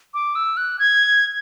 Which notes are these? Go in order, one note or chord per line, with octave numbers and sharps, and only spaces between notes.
D6
E6
F#6
G#6